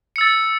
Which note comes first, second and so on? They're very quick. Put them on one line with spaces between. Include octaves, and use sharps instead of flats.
C#7 E6 A6